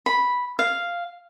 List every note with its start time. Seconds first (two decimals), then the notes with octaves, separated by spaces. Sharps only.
0.06 B5
0.59 F5